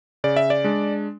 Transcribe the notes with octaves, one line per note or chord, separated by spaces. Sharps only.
C#3 D5
E5
D5
G#3 D4